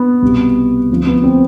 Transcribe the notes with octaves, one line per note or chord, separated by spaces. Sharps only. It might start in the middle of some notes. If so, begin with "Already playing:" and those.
Already playing: B3
C2 B2 G3
D2 C3 F3
B3
C4